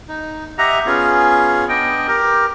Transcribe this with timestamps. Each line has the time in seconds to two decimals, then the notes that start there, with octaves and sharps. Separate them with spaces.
0.08 D#4
0.58 G4 D#5 E5 F#5 A#5
0.86 B3 C#4 F4 G#4
1.69 B3 D4 D#5 G5
2.08 G4 A#4